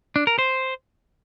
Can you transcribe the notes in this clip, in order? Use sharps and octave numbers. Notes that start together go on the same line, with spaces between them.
D4
A#4
C5